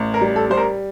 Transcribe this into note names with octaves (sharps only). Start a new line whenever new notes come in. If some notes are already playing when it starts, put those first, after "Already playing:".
Already playing: A1
A#4
G3
A4
G3 C5
A#4